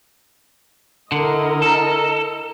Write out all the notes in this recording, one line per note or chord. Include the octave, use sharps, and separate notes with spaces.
D3 E4 A#4 D#5
A4